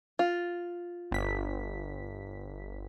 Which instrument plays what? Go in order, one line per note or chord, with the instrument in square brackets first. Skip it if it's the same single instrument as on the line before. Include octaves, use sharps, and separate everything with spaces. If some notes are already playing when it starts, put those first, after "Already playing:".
[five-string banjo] F4
[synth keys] G1 B6